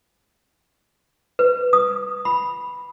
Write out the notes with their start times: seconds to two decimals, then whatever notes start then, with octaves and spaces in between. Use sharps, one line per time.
1.39 B4
1.73 D#6
2.25 B5